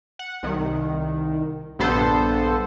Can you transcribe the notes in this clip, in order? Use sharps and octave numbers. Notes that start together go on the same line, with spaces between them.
F#5
C2 D#3
A#1 G2 D3 B3 A4 C5